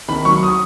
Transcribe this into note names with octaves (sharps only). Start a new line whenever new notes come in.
D#3 B5
F#3 C#6
D#6